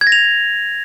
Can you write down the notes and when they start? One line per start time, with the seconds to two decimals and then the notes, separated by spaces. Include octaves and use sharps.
0.01 G#6
0.07 A#6
0.12 F7